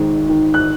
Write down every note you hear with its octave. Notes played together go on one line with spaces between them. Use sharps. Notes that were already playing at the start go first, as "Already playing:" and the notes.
Already playing: G#1 D#3 G#3
D#3
F#6